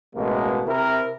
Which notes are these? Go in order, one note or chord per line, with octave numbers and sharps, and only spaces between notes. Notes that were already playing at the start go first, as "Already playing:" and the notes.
A1 B2 G#3 A#3
C3 E4 A#4